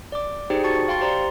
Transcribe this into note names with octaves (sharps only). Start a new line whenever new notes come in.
D5 D6
D#4 G4 G#4 C5 D5 G5
F#4 A5 C#6 A6 C#7
F5 G5 C6 A6
G4 C5 D5 A#5 C6